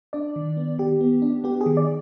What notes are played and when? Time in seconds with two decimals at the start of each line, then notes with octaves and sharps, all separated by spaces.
0.13 D4 D5
0.36 D#3
0.57 B3
0.78 D#3 G4
1.01 B3
1.22 D4
1.44 B3 G4
1.61 G#4
1.66 D#3
1.77 D5